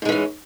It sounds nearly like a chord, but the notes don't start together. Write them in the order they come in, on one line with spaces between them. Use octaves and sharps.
G#2 G#3 E3 C#4